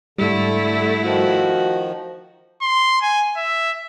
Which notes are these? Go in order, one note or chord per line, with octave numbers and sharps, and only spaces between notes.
G#2 D3 G3 A3 E4
D#3 F3 F#4
C6
G#5
E5